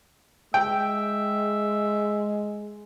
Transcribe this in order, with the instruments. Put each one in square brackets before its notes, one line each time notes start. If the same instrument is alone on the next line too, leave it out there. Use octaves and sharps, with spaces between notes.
[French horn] G#3 [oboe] E5 [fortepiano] G5